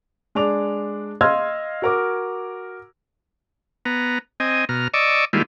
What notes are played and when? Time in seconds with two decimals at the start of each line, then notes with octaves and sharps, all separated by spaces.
0.35 G#3 D4 D6 F7
1.21 D#5 F5 C6 E6 F6 G#6
1.82 F#4 A#4 D6
3.86 B3 A#5
4.40 C4 D#5 G#5
4.69 B2 A#5 F6
4.94 D5 D#5 C#6 D6 E6
5.33 D#3 G3 G#3 A#3 E4 F4